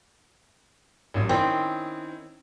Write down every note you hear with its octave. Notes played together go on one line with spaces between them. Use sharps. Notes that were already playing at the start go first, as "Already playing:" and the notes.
A1 F#2 G3
D#3 C4 C#4 E4